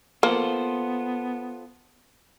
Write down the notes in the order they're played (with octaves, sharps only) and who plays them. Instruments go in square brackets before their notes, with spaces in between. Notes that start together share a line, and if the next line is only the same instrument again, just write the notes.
[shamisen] A#3 [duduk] B3 [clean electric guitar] F4 A4 C5